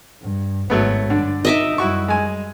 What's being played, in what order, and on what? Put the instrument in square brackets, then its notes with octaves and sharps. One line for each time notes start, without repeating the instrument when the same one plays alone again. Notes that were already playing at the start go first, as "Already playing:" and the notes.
[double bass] G2
[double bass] G#1 [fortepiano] F#3 A3 B3
[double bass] G2 [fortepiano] D3 D4
[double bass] D#4 [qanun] D#5 E5 D6
[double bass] F#2 G3 [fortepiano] E4 F#4 C#6
[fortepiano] G#3 G#5